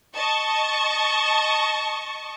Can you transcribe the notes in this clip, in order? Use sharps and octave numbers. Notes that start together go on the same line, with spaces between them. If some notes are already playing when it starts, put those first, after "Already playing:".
D#5 A5 C#6